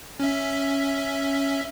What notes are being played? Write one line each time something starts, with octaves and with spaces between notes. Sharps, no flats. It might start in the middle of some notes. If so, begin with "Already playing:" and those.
C#4 E5